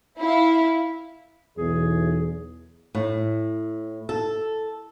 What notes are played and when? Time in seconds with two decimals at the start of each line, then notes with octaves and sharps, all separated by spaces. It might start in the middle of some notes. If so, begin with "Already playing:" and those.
0.19 E4 F5
1.58 B1 E2 G#4
2.95 A2
4.09 A4